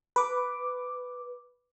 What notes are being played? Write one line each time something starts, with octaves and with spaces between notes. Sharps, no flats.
B4 D6